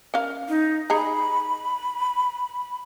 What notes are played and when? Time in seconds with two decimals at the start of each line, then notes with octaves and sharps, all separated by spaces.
0.14 C#4 A#4 F5
0.49 D#4
0.90 D#4 G#4 A#5 B5